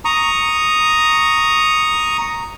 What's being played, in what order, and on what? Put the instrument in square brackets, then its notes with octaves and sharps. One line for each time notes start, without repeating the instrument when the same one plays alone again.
[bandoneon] A#5 C#6 D#6